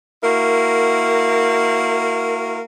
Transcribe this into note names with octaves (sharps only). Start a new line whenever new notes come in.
A#3 E4 F#4 A#4